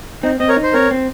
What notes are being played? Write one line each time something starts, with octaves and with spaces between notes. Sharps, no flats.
C4 D#4
C4 D#5
A#4 C#5
D#4
C5
C4 A#4 C#5
C4